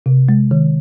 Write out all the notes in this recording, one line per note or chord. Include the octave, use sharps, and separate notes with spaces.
C3
G#3
D#3